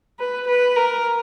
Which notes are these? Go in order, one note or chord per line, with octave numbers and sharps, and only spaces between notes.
B4
B4
A#4